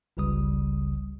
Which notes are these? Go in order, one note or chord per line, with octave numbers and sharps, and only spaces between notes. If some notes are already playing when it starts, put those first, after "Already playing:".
G1 C#2 C#3 G3 D#6